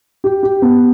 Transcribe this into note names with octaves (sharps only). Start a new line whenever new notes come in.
G4
G4
B3